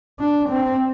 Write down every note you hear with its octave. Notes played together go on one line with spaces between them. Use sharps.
D4
C4